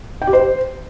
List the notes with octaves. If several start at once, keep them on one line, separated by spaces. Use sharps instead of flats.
G5
G4
C5